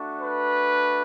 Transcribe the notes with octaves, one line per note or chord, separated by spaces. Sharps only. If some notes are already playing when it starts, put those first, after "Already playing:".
Already playing: A3 D4 F#4
B4